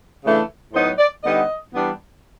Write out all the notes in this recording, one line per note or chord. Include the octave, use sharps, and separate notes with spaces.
C#3 E3 A3 D4
A2 F#3 B3 D#4 C5
D5
D3 G3 B3 D#4 D#5
E3 G3 B3 D4